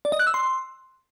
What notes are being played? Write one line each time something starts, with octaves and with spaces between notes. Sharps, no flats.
D5
D#5
F#6
E6
C6